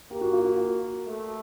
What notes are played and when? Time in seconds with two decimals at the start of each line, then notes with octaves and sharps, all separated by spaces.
0.11 A#3 G4
0.21 F#4
0.33 F4
0.44 F#4
1.07 A3